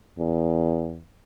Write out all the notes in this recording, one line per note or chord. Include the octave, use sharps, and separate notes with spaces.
E2